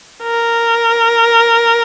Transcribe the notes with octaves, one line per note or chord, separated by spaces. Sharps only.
A#4